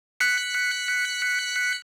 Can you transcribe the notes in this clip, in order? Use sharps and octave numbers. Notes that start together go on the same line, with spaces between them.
F#6 B6 C#7